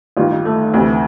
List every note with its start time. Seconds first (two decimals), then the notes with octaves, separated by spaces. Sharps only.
0.17 A1 G2 D#3 F4
0.31 D#4
0.45 A3
0.74 D2 C3 E3